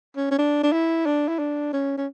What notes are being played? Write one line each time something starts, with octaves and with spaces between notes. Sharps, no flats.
C#4
C#4
D4
D4
E4
D4
E4
D4
C#4
C#4